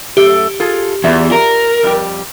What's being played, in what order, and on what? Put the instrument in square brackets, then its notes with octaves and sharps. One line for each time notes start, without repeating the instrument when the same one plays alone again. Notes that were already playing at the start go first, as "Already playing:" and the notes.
[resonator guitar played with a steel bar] F#2 A3 [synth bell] G4
[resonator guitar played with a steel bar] F4 G#4 A4
[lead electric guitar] E2 [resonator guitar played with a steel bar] F4 D5 E5
[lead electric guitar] A#4
[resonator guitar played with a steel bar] F2 G3 G4